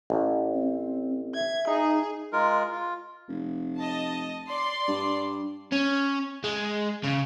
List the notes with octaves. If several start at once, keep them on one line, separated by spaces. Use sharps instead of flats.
A1
C4
E5 G#6
D#4 G#4
G#3 F4 A#4
F4
F1
D#5 A5
D5 C6 C7
G2
C#4
G#3
C#3